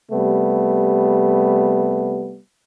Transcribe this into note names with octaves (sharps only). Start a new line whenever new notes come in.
C3 G3 A3 B3